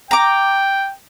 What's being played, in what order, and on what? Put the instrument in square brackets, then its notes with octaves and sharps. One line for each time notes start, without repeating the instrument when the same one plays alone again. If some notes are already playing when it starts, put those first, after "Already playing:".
[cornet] G5 [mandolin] A#5 D6